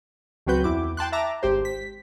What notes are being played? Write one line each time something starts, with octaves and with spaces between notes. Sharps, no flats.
C#2 F#3 C4 F#4 B4 G6
E2 E4 D6
G5 A5 C6 F#6
E5 A5 A#5 D6
G#1 G4 C5
B6